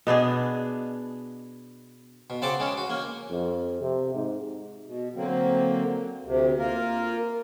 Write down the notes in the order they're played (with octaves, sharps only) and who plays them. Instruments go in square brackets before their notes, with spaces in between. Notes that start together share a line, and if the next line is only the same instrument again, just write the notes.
[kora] B2 B3 D4 G#4
[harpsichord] B2
C#3 C4 F#5 A5 C6 D6
C#2 C#3 G#3 C#4
F#4
A#3 C#4
[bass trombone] F2
C3
G#2
[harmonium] B2
D3 F#3 A#3 C4
D2 C3
A#3 F4 A#4